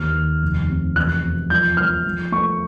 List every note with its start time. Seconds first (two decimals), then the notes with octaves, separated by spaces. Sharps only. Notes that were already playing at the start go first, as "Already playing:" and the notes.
Already playing: D#2 F6
0.15 D#2
0.42 F1
0.69 C3
0.96 E2 F#6
1.23 B2
1.50 F3 G6
1.77 F3 F6
2.04 F3
2.32 A3 C#6